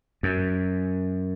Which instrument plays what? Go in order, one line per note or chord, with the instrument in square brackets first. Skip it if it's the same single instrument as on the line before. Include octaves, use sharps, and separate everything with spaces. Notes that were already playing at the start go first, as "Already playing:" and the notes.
[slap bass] F#2